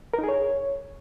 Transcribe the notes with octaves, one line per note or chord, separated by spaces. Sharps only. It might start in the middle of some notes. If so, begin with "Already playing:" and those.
A#4
D#4
G#4
C#5